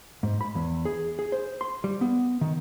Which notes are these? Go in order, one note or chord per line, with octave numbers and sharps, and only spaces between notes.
G#2
B5
E2
G#4
G#4
C5
C6
G3
B3
D#3